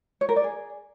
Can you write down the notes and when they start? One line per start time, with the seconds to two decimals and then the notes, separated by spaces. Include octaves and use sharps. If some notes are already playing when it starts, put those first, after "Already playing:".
0.21 C#5
0.29 A#4
0.36 D5
0.44 G#4